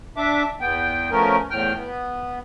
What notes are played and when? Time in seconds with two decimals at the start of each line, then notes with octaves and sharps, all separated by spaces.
0.17 D4 E5 D6
0.61 E2 B3 G5
1.11 F3 A3 B3 C#4 A#4
1.50 E2 A2 G5 F6
1.77 B3